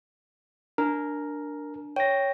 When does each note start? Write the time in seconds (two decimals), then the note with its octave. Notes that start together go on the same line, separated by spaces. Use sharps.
0.78 D4 A#4
1.96 C#5 G5 A#6